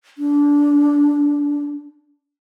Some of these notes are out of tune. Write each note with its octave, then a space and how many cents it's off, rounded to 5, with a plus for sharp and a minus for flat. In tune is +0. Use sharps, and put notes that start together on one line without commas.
D4 -20